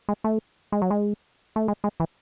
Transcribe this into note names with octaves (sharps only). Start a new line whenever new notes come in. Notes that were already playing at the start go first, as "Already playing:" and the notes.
G#3
A3
G#3
F#3
G#3
A3
G#3
G#3
E3